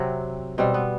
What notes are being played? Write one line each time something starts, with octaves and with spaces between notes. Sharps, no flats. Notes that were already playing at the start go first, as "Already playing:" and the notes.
Already playing: C3 F#3 C4
B2 G3 C4
B3